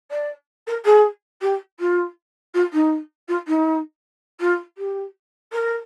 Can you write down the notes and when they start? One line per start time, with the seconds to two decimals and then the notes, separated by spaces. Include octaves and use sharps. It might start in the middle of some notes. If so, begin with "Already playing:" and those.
0.10 D5
0.67 A#4
0.85 G#4
1.41 G4
1.79 F4
2.54 F4
2.72 D#4
3.28 F4
3.47 D#4
4.40 F4
4.77 G4
5.52 A#4